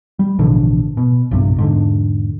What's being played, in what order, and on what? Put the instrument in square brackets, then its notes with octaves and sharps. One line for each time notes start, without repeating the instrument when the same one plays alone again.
[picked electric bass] G3
A1 B2 D3 F3
B2
A#1 G2 C3
E1 G#2 D3